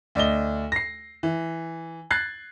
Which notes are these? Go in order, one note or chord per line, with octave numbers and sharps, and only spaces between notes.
D2 D5 D#5 G7
A#6 C7
E3
F#6 G#6 A6 C7